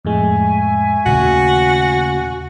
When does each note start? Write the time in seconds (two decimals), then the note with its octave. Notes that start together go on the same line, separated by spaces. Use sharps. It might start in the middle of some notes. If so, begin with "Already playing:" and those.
0.05 F2 A2 G#3 E5 G#5 C#6
1.06 D#2 A#2 C#3 A3 F#4